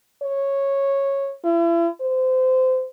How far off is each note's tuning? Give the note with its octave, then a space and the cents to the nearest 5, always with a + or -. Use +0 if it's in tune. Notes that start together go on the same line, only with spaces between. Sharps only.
C#5 -10
E4 +40
C5 -25